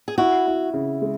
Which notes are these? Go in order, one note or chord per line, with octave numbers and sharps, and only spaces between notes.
G#4
E4 F#4
E4
C#3
G#3